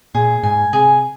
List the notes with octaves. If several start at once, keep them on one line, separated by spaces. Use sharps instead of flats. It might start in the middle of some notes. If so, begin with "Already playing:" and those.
A#2 G#4
G#2 G#5
C3 G#4